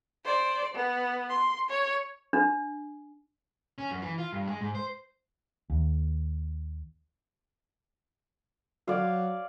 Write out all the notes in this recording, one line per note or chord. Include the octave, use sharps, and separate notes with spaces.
C5 D5
B3
C6
C#5
D4
C#4
F#2
E3
F4
G2
G#3
G#2
C5
D#2
F#3 C#5 D5 F5